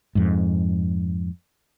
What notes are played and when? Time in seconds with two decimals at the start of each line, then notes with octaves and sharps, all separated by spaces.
0.15 F2 G#2